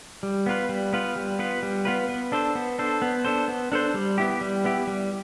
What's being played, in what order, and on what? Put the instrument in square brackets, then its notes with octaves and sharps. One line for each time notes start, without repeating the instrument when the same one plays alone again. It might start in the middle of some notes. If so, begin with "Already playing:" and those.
[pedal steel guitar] G3
B3 F4 B4
G3
B3 F4 B4
G3
B3 F4 B4
G3
B3 F4 B4
B3
D4 A4 C5
B3
D4 A4 C5
B3
D4 A4 C5
B3
D4 A4 C5
G3
B3 E4 G4
G3
B3 E4 G4
G3